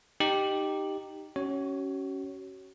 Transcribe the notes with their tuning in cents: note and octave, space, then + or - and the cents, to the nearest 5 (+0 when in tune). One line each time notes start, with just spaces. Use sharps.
D#4 -10 G4 +0
C#4 +0 F#4 +35 C#5 +0